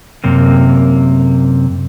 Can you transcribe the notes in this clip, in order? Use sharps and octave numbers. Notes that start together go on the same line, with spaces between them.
F#2 C3 A#3